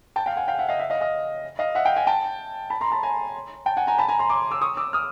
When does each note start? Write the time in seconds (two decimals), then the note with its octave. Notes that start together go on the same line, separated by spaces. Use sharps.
0.16 G5 A5
0.26 F5 G5
0.37 F#5 G#5
0.48 F5 G5
0.59 E5 F#5
0.69 D#5 F5
0.80 E5 F#5
0.90 D#5 F5
1.01 D#5 F5
1.59 D#5 F5
1.75 E5 F#5
1.85 F5 G5
1.96 F#5 G#5
2.07 G5 A5
2.70 A5 B5
2.81 A#5 C6
2.92 A5 B5
3.03 G#5 A#5
3.66 G5 A5
3.77 F#5 G#5
3.87 G#5 A#5
3.98 A5 B5
4.08 G#5 A#5
4.19 A#5 C6
4.30 C6 D6
4.51 D6 E6
4.61 C#6 D#6
4.77 D6 E6
4.93 D#6 F6